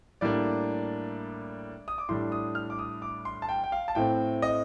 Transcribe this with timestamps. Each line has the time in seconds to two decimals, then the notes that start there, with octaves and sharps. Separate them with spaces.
0.21 A2 G3 A#3 D4 D5
1.88 D#6
1.98 D6
2.09 A2 G3 D4 C6
2.32 D#6
2.55 F6
2.70 D6
2.79 D#6
3.02 D6
3.25 C6
3.42 A5
3.49 G5
3.64 G5
3.72 F5
3.88 A5
3.95 A2 A3 C4 G5
4.42 D#5